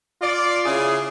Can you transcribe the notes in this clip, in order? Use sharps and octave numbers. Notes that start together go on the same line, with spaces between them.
F4 D5
C#3 E4 G#4